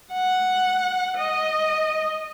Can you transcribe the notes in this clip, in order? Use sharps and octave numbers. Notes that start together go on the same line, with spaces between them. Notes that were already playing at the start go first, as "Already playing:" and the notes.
F#5
D#5